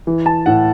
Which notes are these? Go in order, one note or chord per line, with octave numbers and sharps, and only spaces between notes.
E3
A5
A2 F#5